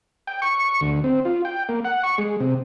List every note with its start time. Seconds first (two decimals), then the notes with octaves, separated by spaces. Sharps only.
0.27 G5
0.42 C#6
0.81 D2
1.04 C4
1.25 F4
1.45 G5
1.69 A#3
1.85 F#5
2.03 C#6
2.18 G#3
2.40 C3